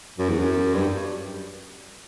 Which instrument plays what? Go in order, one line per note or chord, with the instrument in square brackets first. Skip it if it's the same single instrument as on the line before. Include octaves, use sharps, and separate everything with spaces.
[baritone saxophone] F#2
E2
F#2
G2